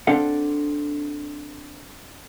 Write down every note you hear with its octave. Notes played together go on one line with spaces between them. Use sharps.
C4 D4 A4 F5 F#5